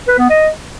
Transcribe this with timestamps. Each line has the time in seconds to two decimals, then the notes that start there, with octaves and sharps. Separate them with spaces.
0.08 B4
0.19 B3
0.30 D#5